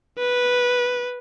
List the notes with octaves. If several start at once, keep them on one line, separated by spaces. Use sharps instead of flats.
B4